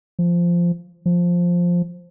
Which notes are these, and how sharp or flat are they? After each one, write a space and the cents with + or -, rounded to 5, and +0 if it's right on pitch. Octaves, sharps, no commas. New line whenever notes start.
F3 -10
F3 +5